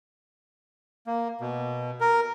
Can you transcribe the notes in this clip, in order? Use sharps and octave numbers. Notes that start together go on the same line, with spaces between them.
A#3
B2
A#4